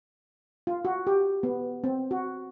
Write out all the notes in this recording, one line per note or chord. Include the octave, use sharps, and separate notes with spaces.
F4
F#4
G4
B3
C4
F#4